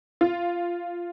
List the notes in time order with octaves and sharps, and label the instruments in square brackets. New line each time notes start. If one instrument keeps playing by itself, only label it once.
[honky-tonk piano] F4